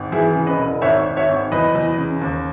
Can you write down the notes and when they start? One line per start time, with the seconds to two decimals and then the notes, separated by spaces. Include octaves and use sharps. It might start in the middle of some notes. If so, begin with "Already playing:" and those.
Already playing: G#1
0.12 E3 E4 G#4
0.36 C#3
0.46 B4 D#5
0.58 E1
0.82 G#1 C#5 E5
1.05 G#1
1.17 C#5 E5
1.29 G#1
1.52 E2 B4 D#5
1.75 E2
1.98 C#3
2.21 D#2